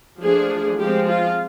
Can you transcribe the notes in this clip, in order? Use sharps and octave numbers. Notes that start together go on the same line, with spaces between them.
F3 A3 D4 G#4
F3 G#3 C4 G4
F4